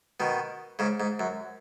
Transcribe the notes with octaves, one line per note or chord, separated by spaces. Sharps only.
B2 D#3
G#2 C#3
G#2
F#2